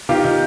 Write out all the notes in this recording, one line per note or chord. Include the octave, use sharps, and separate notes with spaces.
D#3 F4 G4
D#3